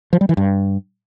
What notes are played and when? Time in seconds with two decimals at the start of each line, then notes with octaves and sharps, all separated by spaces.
0.13 F3
0.21 G3
0.29 E3
0.37 G2